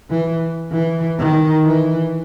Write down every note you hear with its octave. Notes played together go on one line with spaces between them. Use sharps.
E3
E3
D#3
E3